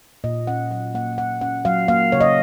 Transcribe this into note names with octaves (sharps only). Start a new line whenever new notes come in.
A#2 D#5
C#4 F#5
F#3 F#5
A#3 F#5
A#2 F#5
C#4 F#5
F#3 F5
A#3 F5
C#3 C#5
D#5